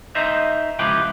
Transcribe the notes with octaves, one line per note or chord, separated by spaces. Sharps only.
D#4 C5 D#5 E5
C#2 F3 E4 G4 B4 G5